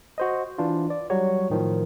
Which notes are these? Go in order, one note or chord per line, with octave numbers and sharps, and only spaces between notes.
F#4 C5 D#5
E3 D4 F4
D5
F#3 G3 F#4 C#5
A2 D#3 F3